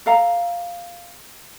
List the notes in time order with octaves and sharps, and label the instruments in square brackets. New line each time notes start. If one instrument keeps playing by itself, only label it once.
[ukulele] A4 F5 A#5